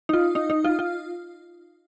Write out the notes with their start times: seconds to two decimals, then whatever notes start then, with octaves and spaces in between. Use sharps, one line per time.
0.09 D#4
0.13 F4
0.35 D#4
0.50 D#4
0.64 F4
0.79 F4